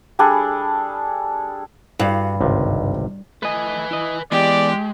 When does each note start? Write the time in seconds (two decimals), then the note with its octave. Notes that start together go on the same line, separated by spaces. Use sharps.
0.19 G3 D4 G#4 A4
1.99 G2 F#4 F5 F#5
2.41 G#1 C#2 C3
3.43 A3 B4 D#5 G#5
3.91 E4 D#5
4.32 E3 G#3 B3 G4 D5